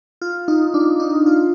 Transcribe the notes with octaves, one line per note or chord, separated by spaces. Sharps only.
F4
D#4
D4
D#4
F4